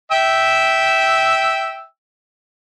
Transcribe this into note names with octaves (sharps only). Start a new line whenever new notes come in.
E5 G5 E6